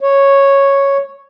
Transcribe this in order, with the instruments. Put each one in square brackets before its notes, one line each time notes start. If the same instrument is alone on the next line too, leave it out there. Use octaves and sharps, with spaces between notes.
[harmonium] C#5